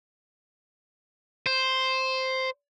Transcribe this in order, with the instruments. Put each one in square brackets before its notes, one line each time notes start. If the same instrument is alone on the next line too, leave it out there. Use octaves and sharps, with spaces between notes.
[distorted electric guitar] C5